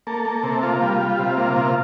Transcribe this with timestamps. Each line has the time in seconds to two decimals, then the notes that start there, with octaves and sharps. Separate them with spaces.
0.07 A#3 A4
0.25 A#3
0.43 C3
0.63 A#3 F4
0.82 G3
1.01 G3
1.19 C3
1.37 A#3
1.56 C3
1.65 F4